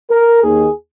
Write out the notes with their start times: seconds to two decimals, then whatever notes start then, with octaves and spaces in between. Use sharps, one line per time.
0.11 A#4
0.43 D#2 D#3 G#4